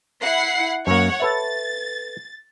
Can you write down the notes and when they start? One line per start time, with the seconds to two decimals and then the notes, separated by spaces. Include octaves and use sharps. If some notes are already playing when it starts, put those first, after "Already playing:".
0.22 E4 F#5 C7
0.87 F#2 A#3 C#5 F#5
1.20 A4 B4 E5 A6